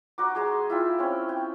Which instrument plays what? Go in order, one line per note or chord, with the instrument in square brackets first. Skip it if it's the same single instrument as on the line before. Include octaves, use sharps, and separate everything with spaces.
[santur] D#4 F#4 D6
G#3 D#4 G#4 C6
E4 F4 G5
C4 C#4
G5